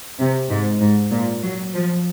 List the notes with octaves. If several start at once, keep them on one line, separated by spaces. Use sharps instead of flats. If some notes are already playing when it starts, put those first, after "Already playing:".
C3
G#2
G#2
A#2
F#3
F3